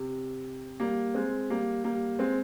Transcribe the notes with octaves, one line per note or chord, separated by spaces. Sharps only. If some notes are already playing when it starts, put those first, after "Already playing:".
Already playing: C3
G3 A#3
G#3 C4
G3 A#3
G3 A#3
G#3 C4